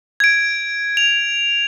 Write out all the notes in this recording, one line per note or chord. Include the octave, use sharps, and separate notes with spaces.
G#6 D7
F7